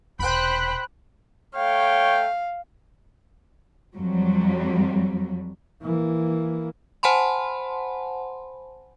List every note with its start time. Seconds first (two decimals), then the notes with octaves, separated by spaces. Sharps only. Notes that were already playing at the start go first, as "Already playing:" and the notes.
0.19 E1 C3 C5 G5 B5 F#6
1.55 A3 C#5 F5 G5
3.93 F2 F#3 G3
5.82 E3 A#3
7.03 C5 F#5 G#5 A5 B5 C6